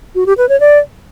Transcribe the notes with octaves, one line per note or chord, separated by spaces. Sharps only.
F#4
G4
B4
C#5
D5